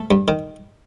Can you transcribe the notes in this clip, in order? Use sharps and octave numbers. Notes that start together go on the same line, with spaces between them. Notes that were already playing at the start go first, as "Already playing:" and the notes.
Already playing: A3 A4
G2
D#3